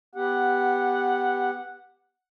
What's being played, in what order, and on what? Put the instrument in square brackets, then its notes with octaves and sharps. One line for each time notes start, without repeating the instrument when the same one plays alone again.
[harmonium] B3 G4 [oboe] F#5